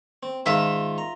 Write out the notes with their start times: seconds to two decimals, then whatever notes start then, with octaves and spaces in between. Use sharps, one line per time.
0.23 C4
0.46 G#2 D#3 F4 E5 A5
0.98 A#5